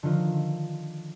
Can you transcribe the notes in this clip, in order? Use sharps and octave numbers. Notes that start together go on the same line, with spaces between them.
D3 D#3 F3 D#4 F4 A#4